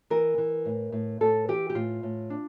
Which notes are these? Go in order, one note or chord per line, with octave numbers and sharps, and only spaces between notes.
E3 A#4
E3
A2
A2
A2 A4
E3 G4
G4
A2 F4
A2
D4